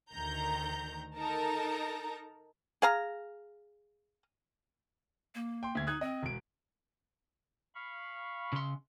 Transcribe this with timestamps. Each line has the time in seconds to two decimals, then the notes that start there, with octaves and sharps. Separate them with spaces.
0.12 D2 D#3 A#5 G6
1.18 D#4 A4 A#4 A5 A#5
2.82 G#4 F5 A#5
5.35 A#3
5.63 G5 C6
5.75 D2 G#6
5.87 D#4 D#6 F#6 G#6
6.01 C4 D#5
6.23 E1 D7
7.75 F5 B5 C#6
8.53 C#3 C6